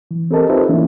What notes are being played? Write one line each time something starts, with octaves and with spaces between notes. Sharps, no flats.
E3
C4 G4 A4 A#4 D#5 A5
D#4 F4 G4 B4 C5 E5
E3 A#3 C#4 D4 E4